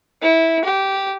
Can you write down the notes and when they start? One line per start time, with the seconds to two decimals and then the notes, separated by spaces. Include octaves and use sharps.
0.22 E4
0.65 G4